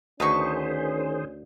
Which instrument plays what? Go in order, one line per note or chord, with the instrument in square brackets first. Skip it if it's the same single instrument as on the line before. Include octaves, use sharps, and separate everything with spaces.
[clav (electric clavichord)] D2 D#5 [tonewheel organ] D#3 G#4 C5 [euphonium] C#4 [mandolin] B4 C#6